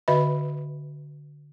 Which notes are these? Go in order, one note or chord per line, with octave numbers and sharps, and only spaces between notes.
D3 F#4 B4 D#5 E5 B5